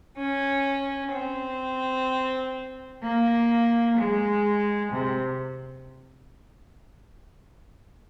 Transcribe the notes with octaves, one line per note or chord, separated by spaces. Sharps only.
C#4
C4
A#3
G#3
C3